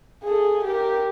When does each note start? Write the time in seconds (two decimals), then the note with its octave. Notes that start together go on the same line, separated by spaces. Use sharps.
0.24 G#4 A4
0.64 G4 A#4